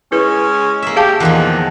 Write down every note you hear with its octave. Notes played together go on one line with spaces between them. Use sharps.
G#3 C#4 E4 B4
A#3 E5
G4 G#4 F5 A5
E2 A#2 D#3 F3 F#5